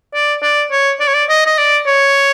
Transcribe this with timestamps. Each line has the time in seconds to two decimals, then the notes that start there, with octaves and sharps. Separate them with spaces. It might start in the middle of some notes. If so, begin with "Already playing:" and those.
0.15 D5
0.43 D5
0.71 C#5
1.00 D5
1.08 C#5
1.14 D5
1.29 D#5
1.46 D#5
1.58 D5
1.86 C#5